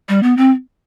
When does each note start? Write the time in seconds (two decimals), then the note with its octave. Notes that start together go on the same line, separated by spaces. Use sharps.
0.09 G3
0.23 B3
0.37 C4